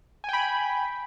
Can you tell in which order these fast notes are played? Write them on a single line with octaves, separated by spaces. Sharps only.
G#5 G5 B5